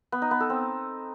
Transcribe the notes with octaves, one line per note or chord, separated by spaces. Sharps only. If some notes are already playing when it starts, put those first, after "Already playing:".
B3
D#4
B3
A4
C4